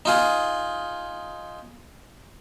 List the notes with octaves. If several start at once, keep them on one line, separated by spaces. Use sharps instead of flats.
D#4 F4 G#4